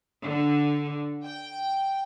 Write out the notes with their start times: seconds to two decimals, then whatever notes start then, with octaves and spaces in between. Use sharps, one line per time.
0.22 D3
1.25 G5